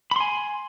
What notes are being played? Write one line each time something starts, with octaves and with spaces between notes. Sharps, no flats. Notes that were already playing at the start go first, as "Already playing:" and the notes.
G#5 B5 C6